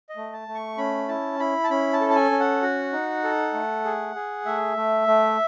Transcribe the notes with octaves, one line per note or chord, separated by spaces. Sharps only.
D#5
A3
A5
A3
C#6
C#4 B5
E4 A5
E4 B5
A5
C#4 B5
A5
A4
A5
G#5
C#4
F#5
F#4
D#4
A4
A3
G#4
G#4
A3 E5
A3
A3